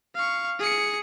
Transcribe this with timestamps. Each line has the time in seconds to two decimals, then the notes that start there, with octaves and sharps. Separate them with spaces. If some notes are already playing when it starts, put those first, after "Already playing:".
0.15 F5 C#6
0.59 G#4 C#7